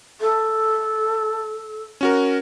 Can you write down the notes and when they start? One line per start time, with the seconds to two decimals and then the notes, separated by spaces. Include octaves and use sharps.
0.21 A4
2.01 C#4 F#4 A#4